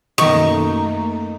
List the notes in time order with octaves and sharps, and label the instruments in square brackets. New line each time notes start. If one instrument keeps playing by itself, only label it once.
[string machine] F#2 A3 A#3 [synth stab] B2 D#3 [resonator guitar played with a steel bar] D#4 [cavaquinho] C#6